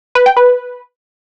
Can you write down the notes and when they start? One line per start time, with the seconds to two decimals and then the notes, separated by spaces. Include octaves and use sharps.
0.15 B4
0.26 G5
0.37 B4